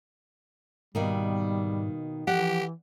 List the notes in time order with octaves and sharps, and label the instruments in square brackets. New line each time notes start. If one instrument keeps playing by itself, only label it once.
[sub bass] G#2 [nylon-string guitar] B2 D#3 A#3 [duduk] G3
[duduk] E3 [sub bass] F3 [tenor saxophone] G4 [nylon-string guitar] F#5